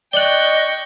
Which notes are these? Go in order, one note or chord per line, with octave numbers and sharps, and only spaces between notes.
D5 D#5 G5 C#6 F#6 F#7 G7